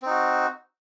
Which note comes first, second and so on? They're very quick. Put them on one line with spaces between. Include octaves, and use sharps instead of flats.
C4 D#4 F#4